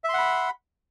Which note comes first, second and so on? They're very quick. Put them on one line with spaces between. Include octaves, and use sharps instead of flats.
E5 C6 F#5 B5